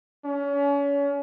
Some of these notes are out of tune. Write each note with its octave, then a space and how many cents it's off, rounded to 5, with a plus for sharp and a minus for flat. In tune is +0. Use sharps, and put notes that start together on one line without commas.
C#4 +35